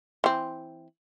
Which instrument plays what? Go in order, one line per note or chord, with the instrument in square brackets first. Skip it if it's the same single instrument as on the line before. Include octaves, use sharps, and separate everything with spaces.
[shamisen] E3 C4